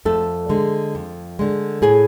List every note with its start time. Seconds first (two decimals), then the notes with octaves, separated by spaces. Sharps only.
0.05 F2 A3 A4
0.49 D3 G#3
0.95 F2
1.39 D3 G#3
1.82 A2 G#4 G#5